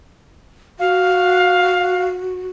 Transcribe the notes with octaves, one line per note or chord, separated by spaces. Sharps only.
F#4 F5